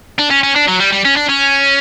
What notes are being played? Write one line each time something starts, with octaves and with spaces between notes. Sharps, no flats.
D4
C#4
C#4
D4
F#3
G3
G3
C#4
D4
C#4